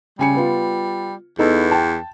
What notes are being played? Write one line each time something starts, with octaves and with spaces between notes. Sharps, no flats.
C#3 G3 G#5 C#7
B3 F4
E2 B3 D#4 A4
G5 A5